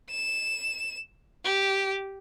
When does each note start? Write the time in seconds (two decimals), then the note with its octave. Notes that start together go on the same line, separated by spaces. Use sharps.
0.10 E7
1.44 G4